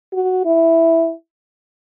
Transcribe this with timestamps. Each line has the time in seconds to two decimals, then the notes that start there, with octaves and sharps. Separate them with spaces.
0.13 F#4
0.45 E4